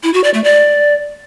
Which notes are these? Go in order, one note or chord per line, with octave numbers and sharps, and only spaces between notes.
E4
F#4
D5
A3
D5